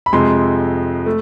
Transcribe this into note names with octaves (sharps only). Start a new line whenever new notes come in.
B5
F2 C3 F3 G#3 C6
A3